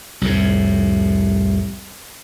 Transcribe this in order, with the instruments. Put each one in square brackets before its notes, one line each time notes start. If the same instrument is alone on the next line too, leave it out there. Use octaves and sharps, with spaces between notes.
[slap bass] C2 F2 A2